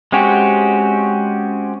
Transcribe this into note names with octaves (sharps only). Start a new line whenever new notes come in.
G#3 C4 C#4 F#4 G4